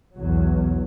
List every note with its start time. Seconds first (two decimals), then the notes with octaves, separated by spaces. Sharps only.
0.15 B1 E2 F#3